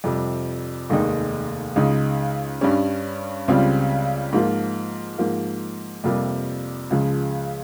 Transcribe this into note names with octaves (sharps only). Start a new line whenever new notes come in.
F2 C3 G3
F1 D#2 D#3 G#3 D#4
C#2 C#3 G#3 D#4
G2 G3 C#4
C#2 C#3 G3 C4 F4
G#2 F3 A#3 F4
G#2 F3 A#3
F2 C3 G3 A#3 F4
C#2 C#3 F3 G#3